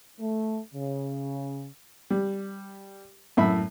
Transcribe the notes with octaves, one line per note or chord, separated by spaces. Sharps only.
A3
C#3
G3
F#2 A2 E5 B5